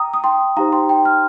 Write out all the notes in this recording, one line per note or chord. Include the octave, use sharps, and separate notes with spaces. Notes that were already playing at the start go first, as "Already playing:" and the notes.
Already playing: G5 A#5 D#6
D#6
G5 C6
D#4 G4 C5 F5 A#5
G5 C6
G5 C6
C6 F6